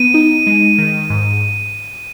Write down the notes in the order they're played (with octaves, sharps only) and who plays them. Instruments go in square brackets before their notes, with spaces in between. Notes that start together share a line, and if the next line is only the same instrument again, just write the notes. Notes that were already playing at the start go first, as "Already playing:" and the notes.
Already playing: [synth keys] B3 [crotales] D#7
[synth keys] D#4
G#3
D#3
G#2